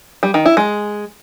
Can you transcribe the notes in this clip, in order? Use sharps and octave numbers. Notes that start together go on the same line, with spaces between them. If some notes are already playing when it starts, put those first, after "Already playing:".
G3
D#3
E4
G#3